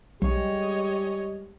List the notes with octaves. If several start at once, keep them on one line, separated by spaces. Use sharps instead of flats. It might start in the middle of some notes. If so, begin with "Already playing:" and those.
B1 G3 G#3 G4 C#5 D#5